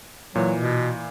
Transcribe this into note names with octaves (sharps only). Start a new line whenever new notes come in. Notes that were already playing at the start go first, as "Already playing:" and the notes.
A#2 E3 F#3
B2